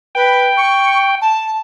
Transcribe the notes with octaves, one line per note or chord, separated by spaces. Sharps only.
B4 G5
C#6
A5